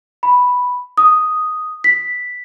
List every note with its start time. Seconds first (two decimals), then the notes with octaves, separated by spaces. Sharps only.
0.23 B5
0.97 D#6
1.84 B6